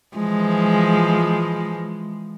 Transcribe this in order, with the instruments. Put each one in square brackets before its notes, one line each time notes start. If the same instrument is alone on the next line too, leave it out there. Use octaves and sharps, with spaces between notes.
[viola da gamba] E3 F3 G#3